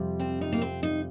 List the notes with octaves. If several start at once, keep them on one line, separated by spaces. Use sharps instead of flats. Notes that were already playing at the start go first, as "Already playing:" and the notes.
Already playing: F2 C3 G3
C4
D#4
A#3
C4
D#4